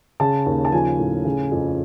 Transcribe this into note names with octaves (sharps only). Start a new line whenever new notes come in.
C#3 A5
D#2
A5
F3 G#5
A2
C#3
F2